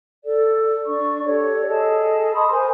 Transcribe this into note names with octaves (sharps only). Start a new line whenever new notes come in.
A4 D5
D4 D5 C#6
G4 A4 C#5 D5
G#4 A4 D#5 A5
A5 B5 C6 D#6
A#4 C5 G#5